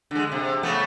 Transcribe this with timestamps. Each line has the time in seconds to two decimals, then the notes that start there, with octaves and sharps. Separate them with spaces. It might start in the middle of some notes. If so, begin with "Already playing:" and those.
0.11 D3 G#3
0.32 C3
0.63 C#3 A3 B3